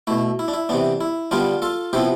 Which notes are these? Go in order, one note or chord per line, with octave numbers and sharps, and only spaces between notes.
B2 A3 E4
E4
D4
E4
C3 E3 B3 D4
E4
D3 G3 B3 D4 F4
F4 A4
C3 F3 B3 E4 G4